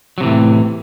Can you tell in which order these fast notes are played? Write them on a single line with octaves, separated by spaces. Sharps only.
F#3 C3 E3 A2